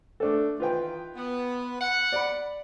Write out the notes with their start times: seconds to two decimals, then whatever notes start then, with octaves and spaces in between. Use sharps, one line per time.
0.20 A3 D4 A4
0.60 D#3 E3 F4 B4 G5
1.15 B3
1.81 F#5
2.12 D5 B5